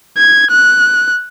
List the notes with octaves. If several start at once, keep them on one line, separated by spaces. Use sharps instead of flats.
G#6
F#6